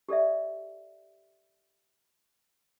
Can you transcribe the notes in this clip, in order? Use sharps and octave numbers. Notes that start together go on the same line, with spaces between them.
G4 A4 D5 E5